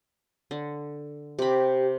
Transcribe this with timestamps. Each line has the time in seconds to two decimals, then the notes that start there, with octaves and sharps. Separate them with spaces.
0.51 D3
1.39 C3 G4 B5